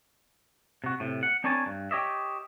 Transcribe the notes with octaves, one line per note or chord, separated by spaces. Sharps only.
C3 F#4
A2 C3
F#5
C4 D4 A#4 C#5 G#5 A5
G2
G4 C#5 D#5 E5